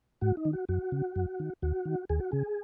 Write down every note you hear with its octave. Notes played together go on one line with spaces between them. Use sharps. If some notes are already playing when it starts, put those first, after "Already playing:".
G#2 F#4
D#4
D#3
F#4
F#2 F#4
C#3
F#2
D#3
D#2 F#4
D#3
D#2 G#4
F#4
C#3 G#4